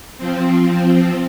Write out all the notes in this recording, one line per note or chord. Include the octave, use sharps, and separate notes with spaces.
F3 C4